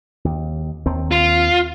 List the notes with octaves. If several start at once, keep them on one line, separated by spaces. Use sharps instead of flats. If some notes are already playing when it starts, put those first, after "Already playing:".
D#2
D#2 D#3 C4
F4